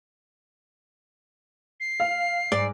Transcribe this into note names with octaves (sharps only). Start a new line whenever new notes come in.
C7
F5
G#2 D5